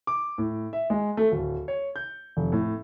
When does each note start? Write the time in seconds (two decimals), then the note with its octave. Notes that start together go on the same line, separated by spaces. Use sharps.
0.07 D6
0.38 A2
0.73 E5
0.90 G#3
1.17 A3
1.31 D1
1.68 C#5
1.96 G6
2.37 F1
2.52 A2